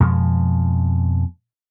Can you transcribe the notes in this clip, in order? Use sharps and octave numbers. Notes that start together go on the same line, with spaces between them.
F2 B2 F3 G#3